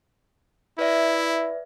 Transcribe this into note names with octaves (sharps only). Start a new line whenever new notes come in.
E4 B4 D5 E5